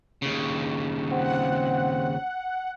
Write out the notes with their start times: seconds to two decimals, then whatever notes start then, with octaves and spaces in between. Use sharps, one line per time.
0.22 D#2 C#3
1.11 C4 F#5